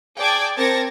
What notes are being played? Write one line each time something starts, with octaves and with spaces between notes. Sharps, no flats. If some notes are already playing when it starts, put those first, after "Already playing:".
G#4 D5 G5 A5 D6 G#6
C4 A#4 A5 G#6 A#6 C#7